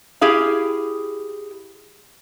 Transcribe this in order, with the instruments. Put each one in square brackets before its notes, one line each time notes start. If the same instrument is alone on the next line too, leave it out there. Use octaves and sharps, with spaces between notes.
[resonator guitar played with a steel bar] E4 G4 G#4 F5